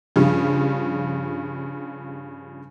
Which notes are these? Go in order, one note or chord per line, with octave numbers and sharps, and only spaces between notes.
G2 C#3 F3 G3